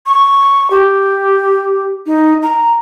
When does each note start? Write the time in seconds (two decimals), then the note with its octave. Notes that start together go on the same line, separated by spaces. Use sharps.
0.06 C#6
0.71 G4
2.06 D#4
2.43 A#5